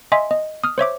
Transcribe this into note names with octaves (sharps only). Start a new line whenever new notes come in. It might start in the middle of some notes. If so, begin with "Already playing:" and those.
D#5 E5 G#5 C6 B6
D#5
D#6 F6
C5 C#5 E5 D6